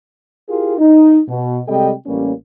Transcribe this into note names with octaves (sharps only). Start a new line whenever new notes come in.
E4 F4 G4 G#4 A#4
D#4
B2
C3 G3 G#3 A4 D#5 G5
A1 G3 A#3 C#4